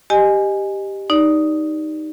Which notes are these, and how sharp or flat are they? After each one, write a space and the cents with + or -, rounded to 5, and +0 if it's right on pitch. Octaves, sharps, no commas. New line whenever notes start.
G4 +0 D#5 -15 G#5 +0
D#4 +0 D5 -10